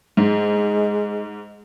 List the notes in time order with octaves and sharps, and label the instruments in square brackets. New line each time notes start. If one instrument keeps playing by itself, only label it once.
[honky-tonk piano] G#2 [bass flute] G#3